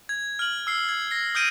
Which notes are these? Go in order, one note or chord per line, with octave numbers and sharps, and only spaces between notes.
G#6
F6 F#7
E6 C7 G7
G#6
A#6 C7
D#6 F6 G6 A#6 D7 D#7